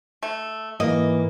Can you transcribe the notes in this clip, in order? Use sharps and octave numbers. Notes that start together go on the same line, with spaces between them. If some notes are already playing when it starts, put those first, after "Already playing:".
A3
G#2 E3 A#3 D#5